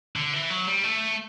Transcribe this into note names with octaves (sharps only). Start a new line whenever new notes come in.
D3
E3
F#3
G3
A3